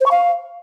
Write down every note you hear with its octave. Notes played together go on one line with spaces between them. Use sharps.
C5
C#6
F5